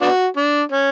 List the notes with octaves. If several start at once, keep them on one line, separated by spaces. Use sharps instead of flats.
B3 D4 F#4
D4
C#4